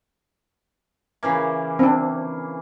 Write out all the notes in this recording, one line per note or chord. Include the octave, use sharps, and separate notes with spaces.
C#3 E3 A#3
C4 D4